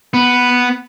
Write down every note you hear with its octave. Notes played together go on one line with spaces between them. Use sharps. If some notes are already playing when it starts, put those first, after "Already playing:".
B3